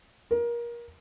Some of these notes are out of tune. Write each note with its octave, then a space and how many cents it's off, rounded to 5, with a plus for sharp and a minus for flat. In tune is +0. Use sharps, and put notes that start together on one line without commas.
A#4 +25